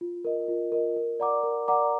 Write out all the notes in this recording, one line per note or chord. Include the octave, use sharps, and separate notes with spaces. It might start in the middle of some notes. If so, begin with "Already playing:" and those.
F4
A#4 D#5
F4
A#4 D#5
A#4
D5 F#5 A#5 D6
A#4
D5 F#5 A#5 D6